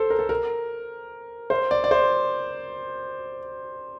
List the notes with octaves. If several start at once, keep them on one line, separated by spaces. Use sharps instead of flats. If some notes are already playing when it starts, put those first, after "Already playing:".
Already playing: A4 C5
A#4
A4
A#4
C5
D5
D5
C5